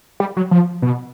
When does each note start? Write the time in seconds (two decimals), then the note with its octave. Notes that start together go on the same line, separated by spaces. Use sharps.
0.20 G3
0.37 F#3
0.51 F3
0.82 B2